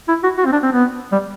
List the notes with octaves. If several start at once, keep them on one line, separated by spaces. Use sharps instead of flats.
E4
F#4
F#4
C4
D4
C4
B3
G3